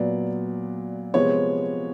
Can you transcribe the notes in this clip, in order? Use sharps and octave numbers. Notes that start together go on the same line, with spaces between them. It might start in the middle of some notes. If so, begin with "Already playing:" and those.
Already playing: A#2 F#3 B3 D5
C3 F3 G#3 B3 C#5